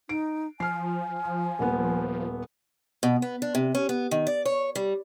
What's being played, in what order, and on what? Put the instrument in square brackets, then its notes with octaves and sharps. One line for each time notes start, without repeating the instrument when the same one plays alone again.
[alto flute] D#4 [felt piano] D7
[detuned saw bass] F3 [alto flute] G#5 [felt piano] F6 C7
[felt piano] D#1 B3
[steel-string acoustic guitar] B2
B3
D4
C3
C#4
B3
D#3
D5
C#5
G3